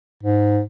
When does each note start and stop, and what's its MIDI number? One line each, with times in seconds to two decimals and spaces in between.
0.23 0.62 44